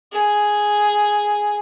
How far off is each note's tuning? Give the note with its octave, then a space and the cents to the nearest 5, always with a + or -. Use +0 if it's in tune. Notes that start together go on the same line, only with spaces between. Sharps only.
G#4 +0